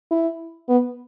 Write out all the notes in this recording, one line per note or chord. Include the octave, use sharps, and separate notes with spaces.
E4
B3